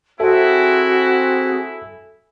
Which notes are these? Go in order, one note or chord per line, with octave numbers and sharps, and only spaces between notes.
C4 E4 F#4 G#4 A4 E5 G#5